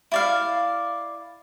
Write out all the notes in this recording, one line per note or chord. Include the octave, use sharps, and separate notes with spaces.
E4 D5 F5